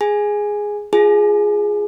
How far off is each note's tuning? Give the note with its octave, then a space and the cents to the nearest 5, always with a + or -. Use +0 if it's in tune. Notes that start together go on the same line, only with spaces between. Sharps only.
G#4 +0 G#5 +0
F4 +0 G#4 +0 G#5 +35